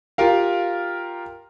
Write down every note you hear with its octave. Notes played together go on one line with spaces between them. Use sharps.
F4 G4 A#4 F5